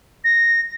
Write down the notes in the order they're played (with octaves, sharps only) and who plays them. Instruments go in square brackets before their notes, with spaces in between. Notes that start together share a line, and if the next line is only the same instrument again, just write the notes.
[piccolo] A#6